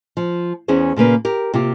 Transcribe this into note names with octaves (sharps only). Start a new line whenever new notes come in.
F3
E2 C#4 E4 G#4 C5
A#2 C#3 A#3 B4
G4 A#4
C3 A#3 F4 G4